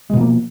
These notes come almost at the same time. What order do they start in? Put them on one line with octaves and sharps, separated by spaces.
G#3 B2 F3 A#3